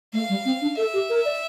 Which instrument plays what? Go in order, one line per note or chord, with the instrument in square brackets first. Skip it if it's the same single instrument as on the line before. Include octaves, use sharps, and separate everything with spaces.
[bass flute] A3 [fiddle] F5
[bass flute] G3
C4
D4
[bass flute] A4 [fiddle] E5
[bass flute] G4
A#4
D5